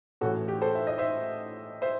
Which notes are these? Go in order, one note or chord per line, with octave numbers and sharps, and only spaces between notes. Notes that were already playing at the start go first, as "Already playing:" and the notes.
A1 A2 E3 F#4 A4
G4
A4 C5
E5
D#5
C5 E5
C5 E5